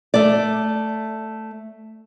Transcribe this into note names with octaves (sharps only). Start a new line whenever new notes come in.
A3 D5